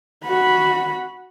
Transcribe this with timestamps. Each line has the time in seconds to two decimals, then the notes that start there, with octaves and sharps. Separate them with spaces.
0.24 F#4 B5